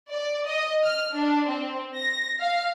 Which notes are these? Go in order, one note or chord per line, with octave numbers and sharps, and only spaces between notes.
D5
D#5
F6
D4
C4
A#6
F5